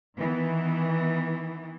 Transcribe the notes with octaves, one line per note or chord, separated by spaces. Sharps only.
D#3 E3 B3